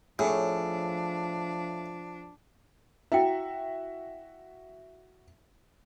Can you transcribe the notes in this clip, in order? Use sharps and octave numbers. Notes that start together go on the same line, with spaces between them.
A2 F3 D4 G#4 C#5
E4 F#4 E5 G5